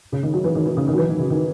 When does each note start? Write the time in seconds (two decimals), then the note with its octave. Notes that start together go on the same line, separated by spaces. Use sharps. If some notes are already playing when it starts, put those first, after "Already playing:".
0.12 C#3
0.23 D#3
0.33 F#3
0.44 E3
0.55 D#3
0.66 E3
0.77 C#3
0.88 D#3
0.93 F#3
0.98 E3
1.08 D#3
1.19 C#3
1.30 D#3